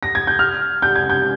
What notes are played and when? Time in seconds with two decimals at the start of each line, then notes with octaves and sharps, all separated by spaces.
0.03 A#6
0.15 G#6
0.27 G6
0.39 F6
0.82 G6
0.96 G#6
1.10 G6